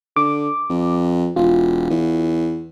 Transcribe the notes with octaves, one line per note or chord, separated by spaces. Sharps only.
D3 D6
F2
E1 F4
E2